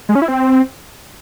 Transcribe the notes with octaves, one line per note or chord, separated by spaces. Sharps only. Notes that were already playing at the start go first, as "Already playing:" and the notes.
G#3
C#4
E4
C4